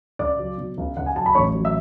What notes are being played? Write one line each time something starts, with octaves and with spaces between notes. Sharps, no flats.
C#2 D5 D6
F#3
B2
C#2
C#2 F#5
G#5
F#3 A5
B5
A1 C#5 C#6
F#3
E5 E6